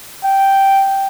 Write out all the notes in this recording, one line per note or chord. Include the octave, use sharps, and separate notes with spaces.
G5